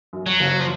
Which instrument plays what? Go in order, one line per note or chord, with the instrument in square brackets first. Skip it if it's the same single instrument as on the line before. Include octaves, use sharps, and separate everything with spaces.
[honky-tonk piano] F#2
[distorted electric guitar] F#3
[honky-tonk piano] F#1
[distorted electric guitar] F3